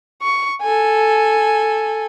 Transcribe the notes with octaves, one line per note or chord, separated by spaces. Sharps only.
C#6
A4 G#5